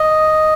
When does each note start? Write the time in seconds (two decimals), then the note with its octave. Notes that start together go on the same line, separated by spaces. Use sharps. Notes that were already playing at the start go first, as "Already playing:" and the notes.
Already playing: D#5